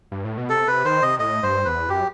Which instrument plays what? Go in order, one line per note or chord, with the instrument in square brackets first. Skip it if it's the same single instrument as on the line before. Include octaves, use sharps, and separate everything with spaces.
[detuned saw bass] G2
A2
B2
[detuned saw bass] C3 [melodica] A4
[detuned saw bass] C3 [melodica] B4
[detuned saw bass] D#3 [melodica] C5
[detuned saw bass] C3 [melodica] D#5
[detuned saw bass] A2 [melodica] D#5
[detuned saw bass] G2 [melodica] C5
[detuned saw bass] E2 [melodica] B4
[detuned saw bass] F#2 [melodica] G4